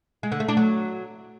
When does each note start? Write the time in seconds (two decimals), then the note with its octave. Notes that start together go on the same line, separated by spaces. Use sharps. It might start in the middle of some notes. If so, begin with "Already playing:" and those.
0.23 G#3
0.32 D3
0.40 A3
0.48 D4
0.57 F#3